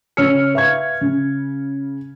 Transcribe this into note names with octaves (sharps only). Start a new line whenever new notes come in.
C#3 C#5 E6 F6 C#7
B4 E5 F5 C#6 G#6
C#3